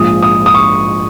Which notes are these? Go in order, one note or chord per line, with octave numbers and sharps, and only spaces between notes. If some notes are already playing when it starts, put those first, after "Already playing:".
Already playing: A#1 G#2 F3 D#6
D#6
D#6
C#6